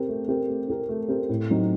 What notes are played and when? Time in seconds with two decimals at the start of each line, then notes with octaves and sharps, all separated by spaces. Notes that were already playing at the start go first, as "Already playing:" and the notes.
Already playing: C4 G4 A#4
0.08 A3
0.28 C4 G4 A#4
0.49 A3
0.68 C4 G4 A#4
0.89 A3
1.09 C4 G4 A#4
1.29 A2
1.50 F#3 C4 D#4